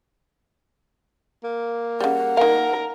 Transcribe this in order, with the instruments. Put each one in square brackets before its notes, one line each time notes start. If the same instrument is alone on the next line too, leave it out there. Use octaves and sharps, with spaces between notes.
[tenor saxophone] A#3
[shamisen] C#3 G3 [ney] F#5
[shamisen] D#3 F5 [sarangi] A#4